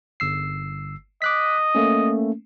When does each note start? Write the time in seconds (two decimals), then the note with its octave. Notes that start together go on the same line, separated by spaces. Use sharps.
0.20 G1 E6 C7
1.22 D#5 D6 F#6 B6
1.75 A3 A#3 C#4